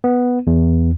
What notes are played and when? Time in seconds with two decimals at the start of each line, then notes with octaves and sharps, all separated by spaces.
0.04 B3
0.47 E2